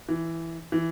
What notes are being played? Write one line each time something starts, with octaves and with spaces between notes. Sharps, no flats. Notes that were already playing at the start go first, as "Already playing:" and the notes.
E3
E3